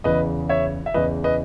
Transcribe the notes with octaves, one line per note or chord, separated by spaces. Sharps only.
E2 C#3 E3 B4 D#5
C#5 E5
E5
E2 C#3 E3 B4 D#5
B4 D#5